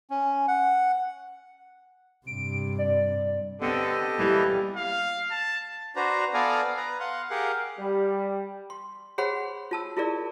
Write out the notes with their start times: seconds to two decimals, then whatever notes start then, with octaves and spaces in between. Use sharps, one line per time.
0.10 C#4
0.48 F#5
2.27 G2 C3 D7
2.78 D5
3.62 D3 B3 C4 G4 A4 D#5
4.19 E3 G3 A#3 E4
4.76 F5
5.31 A5
5.96 D4 F#4 B4 C5 A#5
6.34 B3 A4 D5 F5 G#5 A#5
6.77 B4 A#5
7.00 F5 F#5 C6
7.30 G4 G#4 A#4 F5 F#5
7.79 G3
8.70 C6
9.18 G#4 C5 C#5 F#5 B5 C6
9.71 F4 A5 E6
9.97 E4 F4 G#4 A#4 D5